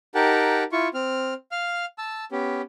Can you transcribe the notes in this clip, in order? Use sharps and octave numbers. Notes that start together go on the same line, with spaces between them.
D#4 G4 A#4 F#5 G5 A5
E4 F4 C#6
C4 F6
F5 F6
A5 E6
B3 C#4 G4